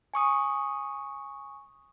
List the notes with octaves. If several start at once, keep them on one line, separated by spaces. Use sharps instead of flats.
G#5 C#6 D#6